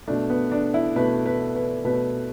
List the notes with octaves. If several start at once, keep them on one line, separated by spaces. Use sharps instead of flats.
B2 A3 D4
B3
D4
E4
B2 A3 B4
B4
B4
B2 A3 B4